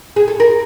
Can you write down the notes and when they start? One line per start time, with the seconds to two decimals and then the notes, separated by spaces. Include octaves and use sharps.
0.16 G#4
0.28 A4
0.40 A#4